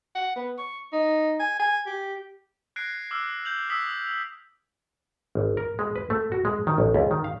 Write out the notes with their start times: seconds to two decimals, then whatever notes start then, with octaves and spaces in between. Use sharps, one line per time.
0.15 F#5
0.36 B3
0.58 C#6
0.93 D#4
1.40 G#5
1.60 G#5
1.87 G4
2.76 F#6 G#6 A#6 C7 D7
3.11 D6 E6 F6
3.45 G6 F7 F#7
3.70 D#6 E6 B6 D7
5.35 G#1
5.57 A#4
5.79 G#3
5.96 B4
6.10 A3
6.32 F#4
6.45 G#3
6.67 D#3
6.78 A1
6.94 C#2
7.11 D#3
7.24 F5